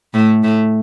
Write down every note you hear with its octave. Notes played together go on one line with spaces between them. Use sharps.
A2 A3
A2 A3